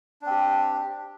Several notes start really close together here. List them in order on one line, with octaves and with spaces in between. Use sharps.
D4 C4 G4